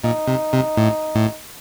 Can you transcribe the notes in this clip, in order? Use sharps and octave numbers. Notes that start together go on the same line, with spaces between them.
A#2 D#4
C3
C3
A2
A2